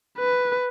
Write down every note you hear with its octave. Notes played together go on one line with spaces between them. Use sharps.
B4